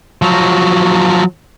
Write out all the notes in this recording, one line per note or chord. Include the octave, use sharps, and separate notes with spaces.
F3 F#3